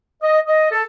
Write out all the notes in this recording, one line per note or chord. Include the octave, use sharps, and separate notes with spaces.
D#5
D#5
A4